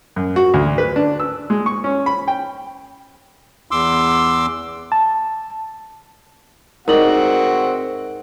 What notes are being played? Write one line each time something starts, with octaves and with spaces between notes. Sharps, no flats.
F#2
F#4
D2
B4
D4
E6
G#3
C#6
C#4
B5
G5
E2 C6 D6 E6
A5
G#2 C4 F#4 A#4 D5 D#5 F#5 F#7